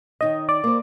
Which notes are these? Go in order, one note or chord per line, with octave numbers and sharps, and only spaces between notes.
D#3 D#4 C#5 D#5
D5
A#3 C5